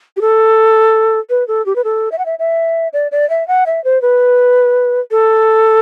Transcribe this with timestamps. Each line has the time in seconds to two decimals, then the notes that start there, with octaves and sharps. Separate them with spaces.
0.17 G4
0.21 A4
1.30 B4
1.48 A4
1.66 G4
1.76 B4
1.84 A4
2.12 E5
2.19 F#5
2.26 E5
2.39 E5
2.93 D5
3.12 D5
3.30 E5
3.48 F#5
3.66 E5
3.84 C5
4.02 B4
5.11 A4